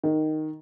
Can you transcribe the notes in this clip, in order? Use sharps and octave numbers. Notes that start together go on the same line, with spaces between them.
D#3